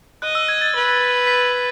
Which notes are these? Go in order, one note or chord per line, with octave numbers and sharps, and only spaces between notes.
D#5 F#6
E6
G#6
A6
B4
B6